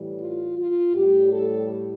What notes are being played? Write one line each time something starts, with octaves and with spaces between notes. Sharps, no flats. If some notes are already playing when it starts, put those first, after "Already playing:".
Already playing: A2 E3 G3
F4
F4
A2 G3 G4
A4